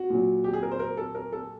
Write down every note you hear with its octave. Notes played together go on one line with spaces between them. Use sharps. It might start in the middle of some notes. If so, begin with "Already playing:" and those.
Already playing: F#4
A#2 F#3
G4
G#4
A#4
C5
A#4
A4
A#4
A4